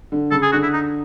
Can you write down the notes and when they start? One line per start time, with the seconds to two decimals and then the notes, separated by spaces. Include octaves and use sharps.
0.12 D3
0.31 C#3 A4
0.42 G#4
0.52 D3 F#4
0.63 E4
0.73 D#4